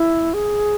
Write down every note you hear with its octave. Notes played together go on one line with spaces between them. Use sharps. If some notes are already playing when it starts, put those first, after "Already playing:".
Already playing: E4
G#4